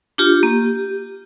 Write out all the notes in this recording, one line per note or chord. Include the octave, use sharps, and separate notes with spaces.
D4 F4 G4
A#3